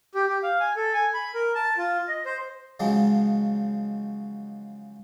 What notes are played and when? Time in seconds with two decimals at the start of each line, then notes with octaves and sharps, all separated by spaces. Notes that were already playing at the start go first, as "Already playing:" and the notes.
0.15 G4
0.28 G4
0.43 F5
0.60 G#5
0.76 A4
0.94 G#5
1.14 B5
1.34 A#4
1.55 A5
1.77 F4
2.08 D#5
2.25 C5
2.80 C#3 F3 F#3 G#3 D#4